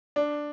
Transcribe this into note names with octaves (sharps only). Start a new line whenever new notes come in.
D4